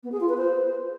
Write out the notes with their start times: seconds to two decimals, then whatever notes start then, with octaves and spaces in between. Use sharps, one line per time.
0.03 B3
0.12 G#4
0.20 F4
0.29 B4
0.37 C5